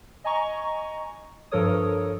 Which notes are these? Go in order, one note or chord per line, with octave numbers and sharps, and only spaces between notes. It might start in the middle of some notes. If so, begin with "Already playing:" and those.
D#5 G#5 A#5 C#6
G2 F3 A4 A#4 C#5 D#6